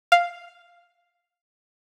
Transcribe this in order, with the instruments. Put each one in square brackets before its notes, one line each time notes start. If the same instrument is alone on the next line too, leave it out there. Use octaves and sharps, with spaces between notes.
[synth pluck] F5